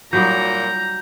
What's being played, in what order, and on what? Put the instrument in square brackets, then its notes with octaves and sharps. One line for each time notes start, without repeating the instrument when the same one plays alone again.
[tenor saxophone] A#2 [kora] F#3 G3 D#4 [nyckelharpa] A#5 [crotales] G6